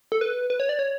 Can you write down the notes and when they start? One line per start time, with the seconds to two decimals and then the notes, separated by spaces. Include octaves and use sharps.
0.12 A4
0.21 B4
0.50 B4
0.60 C#5
0.69 D5
0.79 C#5